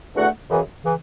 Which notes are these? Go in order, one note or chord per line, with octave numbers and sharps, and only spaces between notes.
E2 D3 A3 F#4 F#5
F#2 C#3 E3
C#3 E3